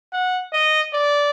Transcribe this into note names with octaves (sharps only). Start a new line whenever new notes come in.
F#5
D#5
D5